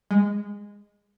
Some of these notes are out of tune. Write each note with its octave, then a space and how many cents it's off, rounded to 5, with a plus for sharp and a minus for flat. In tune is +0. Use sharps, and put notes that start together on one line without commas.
G#3 -15